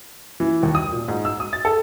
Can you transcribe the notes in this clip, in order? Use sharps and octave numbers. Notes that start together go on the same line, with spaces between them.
E3
D#2
D#6
A#2
G#2
E6
D#6
A6
A4